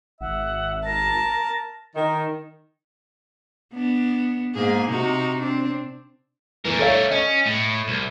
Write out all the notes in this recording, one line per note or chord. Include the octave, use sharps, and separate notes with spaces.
G#1 E5 F#5
A#4 A5 A#6
D#3
B3 D4
G#2 A#3 G#4
C3 D#4 F#4
C4 D4
E3 A3 A#4
A4 C#5 F5
C#4 D#5
A2
C2